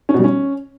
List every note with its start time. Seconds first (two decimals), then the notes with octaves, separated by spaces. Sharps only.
0.09 C#4
0.14 B2
0.19 G3
0.24 C#4